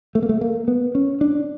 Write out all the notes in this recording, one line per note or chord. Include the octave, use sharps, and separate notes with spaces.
A3
A#3
A3
A#3
B3
C#4
D4